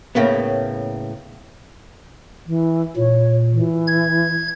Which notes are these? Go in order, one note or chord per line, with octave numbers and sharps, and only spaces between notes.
A2 C#3 A#3 B3
E3
A#2 C#5
E3
G#6